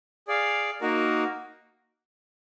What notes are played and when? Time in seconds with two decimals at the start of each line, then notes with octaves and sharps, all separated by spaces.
0.28 G#4 D5 F5
0.81 A#3 D#4 F#4 A#4